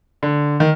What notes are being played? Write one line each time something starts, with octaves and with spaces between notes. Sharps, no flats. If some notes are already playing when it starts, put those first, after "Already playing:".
D3
D#3